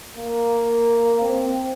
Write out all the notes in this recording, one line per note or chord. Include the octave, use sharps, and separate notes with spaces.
A#3
C4